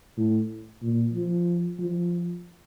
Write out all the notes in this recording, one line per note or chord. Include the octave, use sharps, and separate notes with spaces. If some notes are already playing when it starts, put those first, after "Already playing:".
A2
A#2
F3
F3